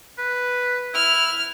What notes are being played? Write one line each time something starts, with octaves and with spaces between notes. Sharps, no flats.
B4
E4 F6